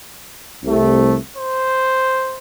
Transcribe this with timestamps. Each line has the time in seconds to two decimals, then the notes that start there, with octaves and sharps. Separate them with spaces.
0.64 C2 C3 A3
1.37 C5